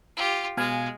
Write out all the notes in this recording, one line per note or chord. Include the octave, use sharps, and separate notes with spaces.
F4 G4
B2 G#3 F5 G#5